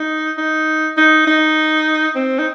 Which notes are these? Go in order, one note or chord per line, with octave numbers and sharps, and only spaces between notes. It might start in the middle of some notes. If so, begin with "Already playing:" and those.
Already playing: D#4
D#4
D#4
D#4
C4
D#4